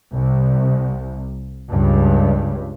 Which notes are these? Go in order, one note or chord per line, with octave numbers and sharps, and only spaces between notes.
C2
C#2 G2